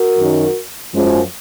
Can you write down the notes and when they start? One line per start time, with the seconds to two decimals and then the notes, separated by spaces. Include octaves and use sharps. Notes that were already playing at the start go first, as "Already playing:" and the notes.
Already playing: F#4 A#4
0.17 F#2 D#3 F#3
0.94 F#2 F3 G#3